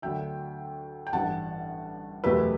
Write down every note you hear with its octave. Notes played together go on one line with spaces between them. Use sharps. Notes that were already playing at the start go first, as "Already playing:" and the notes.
D2 D3 F#3 E5 G5
G5
A1 G2 E3 F#5 A5
F#1 E2 B2 A3 G4 B4